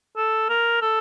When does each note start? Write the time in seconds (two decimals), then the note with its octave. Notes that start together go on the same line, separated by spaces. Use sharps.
0.17 A4
0.49 A#4
0.82 A4